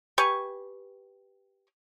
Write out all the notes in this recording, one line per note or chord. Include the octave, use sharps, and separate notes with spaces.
G4 B4 G#5 C#6